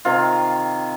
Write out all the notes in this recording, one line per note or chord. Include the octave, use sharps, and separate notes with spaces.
C3 D#3 F4